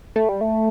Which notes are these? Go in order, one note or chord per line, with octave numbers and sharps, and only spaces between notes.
A3
G3
A3